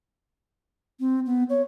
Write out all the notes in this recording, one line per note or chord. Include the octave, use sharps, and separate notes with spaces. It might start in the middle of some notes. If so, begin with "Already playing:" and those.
C4
B3
C#5